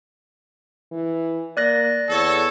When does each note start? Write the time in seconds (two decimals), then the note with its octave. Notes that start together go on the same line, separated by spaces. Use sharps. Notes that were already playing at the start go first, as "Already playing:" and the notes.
0.92 E3
1.57 A#3 D5 F#6 A#6
2.09 E2 A4 C#5